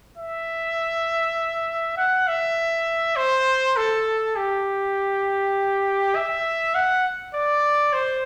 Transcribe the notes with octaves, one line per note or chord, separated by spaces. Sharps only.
E5
F#5
E5
C5
A4
G4
E5
F#5
D5
C5